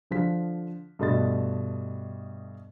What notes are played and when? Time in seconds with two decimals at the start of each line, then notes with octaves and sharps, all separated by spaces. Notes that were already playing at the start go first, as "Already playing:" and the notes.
0.11 D3 F3 B6
0.99 G2 B2 A3 D#5 C6 A6